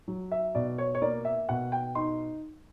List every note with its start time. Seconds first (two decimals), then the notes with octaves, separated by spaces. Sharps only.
0.08 F#3
0.32 E5
0.55 B2 D5
0.78 C#5
0.95 C#5
1.02 A#3 D5
1.25 E5
1.49 B2 F#5
1.72 G5
1.95 D#4 C6